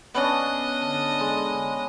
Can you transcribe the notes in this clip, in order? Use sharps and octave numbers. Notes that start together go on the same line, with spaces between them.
B3 C#4 D4 D#5
D3 A5
G#3